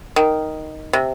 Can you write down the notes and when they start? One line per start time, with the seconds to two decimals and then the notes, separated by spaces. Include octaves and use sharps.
0.16 D#3
0.93 C3